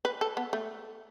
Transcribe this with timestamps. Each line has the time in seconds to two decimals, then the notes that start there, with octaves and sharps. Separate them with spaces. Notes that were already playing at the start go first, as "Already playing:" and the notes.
0.05 B4
0.21 A4
0.37 B3
0.53 A3